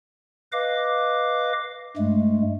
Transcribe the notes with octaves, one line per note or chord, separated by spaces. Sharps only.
B4 D#5 F5 D6
G2 G#3 A3